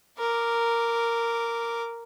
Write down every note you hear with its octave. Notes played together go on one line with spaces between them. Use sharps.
A#4 D6